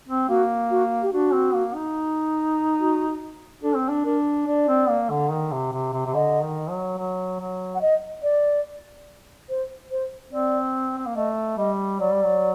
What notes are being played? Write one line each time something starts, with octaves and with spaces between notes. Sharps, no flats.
C4
A#3 F#4
F#4
G4
D4 F#4
C4
A#3
D#4
F#4
D4 A4
C4
D4
D4 A#4
D4 D5
C4
A#3
D3
D#3
C3
C3
C3
C3
D3 D#5
D#3
F#3
F#3
F#3
F#5
D#5
D5
C5
C5
C4 D5
C4
A#3
A3 D#5
G3 D#5
F#3 D5
G3
F#3